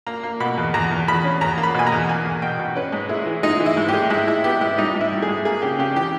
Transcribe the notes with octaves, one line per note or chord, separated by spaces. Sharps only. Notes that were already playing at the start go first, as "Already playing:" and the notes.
A#3 A#5
A#3
B2 B5
E2
E2 A#5
E2
E2 B5
C#4
E2 A#5
A#3
B5
B2 G#5
A#5
E2
A#3 G#5
E2
B2 G5
B2
C#4 B4
G#2
G#3 E4
E3
G#3 D#4
E3
E4
G#2
G4
G#3
G#2 E4
G#2 E4
B3 G4
G#2 E4
G3 D#4
G#2
E4
G3
G#4
G#2
A#3 G#4
C#3 G4
C#3 G4
E3 G4